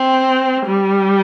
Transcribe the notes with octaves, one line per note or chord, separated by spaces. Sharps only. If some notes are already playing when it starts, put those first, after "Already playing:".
Already playing: C4
G3